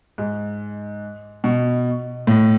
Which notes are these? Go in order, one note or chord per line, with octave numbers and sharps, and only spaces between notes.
G#2
B2
A2